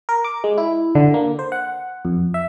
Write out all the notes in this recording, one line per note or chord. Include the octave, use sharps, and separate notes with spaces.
A#4
D6
G#3
E4
D3
A#3
C5
F#5
F2
E5